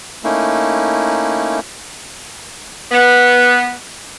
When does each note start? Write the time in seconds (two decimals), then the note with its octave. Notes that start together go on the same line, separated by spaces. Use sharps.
0.24 A3 A#3 C#4 D#4 E4
2.92 B3